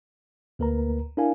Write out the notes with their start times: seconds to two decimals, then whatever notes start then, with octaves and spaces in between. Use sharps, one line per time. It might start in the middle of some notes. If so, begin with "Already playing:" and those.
0.59 D2 A#3 A#4 B4 A#5
1.17 D4 E4 A#4 F5 G#5